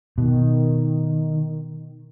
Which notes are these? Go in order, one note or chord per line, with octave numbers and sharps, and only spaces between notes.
B2 D#3